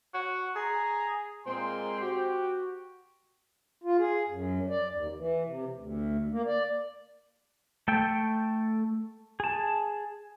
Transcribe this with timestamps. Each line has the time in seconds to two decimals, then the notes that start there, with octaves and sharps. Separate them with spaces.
0.14 F#4
0.56 G#4 A#5
1.46 A#2 G#3 C4 C6
2.00 F#4 G4
3.84 F4
3.99 G#4
4.29 F#2
4.69 D5
4.92 D#2
5.17 E3
5.46 C3
5.76 D2
6.32 A#3
6.46 D5
7.88 A3 A4 G5
9.40 G#4 A5